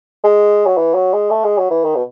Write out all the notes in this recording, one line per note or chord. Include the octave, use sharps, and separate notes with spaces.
G#3
F#3
E3
F#3
G#3
A3
G#3
F#3
E3
D#3
B2